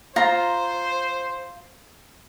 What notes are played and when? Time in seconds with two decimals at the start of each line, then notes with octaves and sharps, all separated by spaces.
0.16 F4 C5 A#5